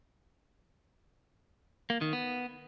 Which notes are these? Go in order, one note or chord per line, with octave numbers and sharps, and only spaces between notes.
A#3
D#3
B3